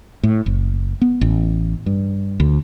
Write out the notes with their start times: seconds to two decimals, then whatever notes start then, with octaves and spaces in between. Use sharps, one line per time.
0.23 A2
0.46 F#1
1.01 B3
1.21 A1
1.86 G2
2.40 D2